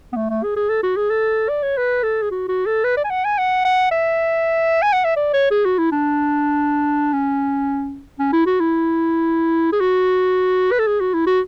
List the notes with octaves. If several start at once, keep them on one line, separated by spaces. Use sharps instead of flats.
B3
A3
A3
G#4
G#4
A4
F#4
G#4
A4
D5
C#5
B4
A4
G#4
F#4
F#4
A4
B4
D5
G#5
F#5
G#5
F#5
F#5
E5
G#5
F#5
E5
D5
C#5
G#4
F#4
E4
D4
C#4
C#4
E4
F#4
E4
G#4
F#4
B4
A4
G#4
F#4
E4
F#4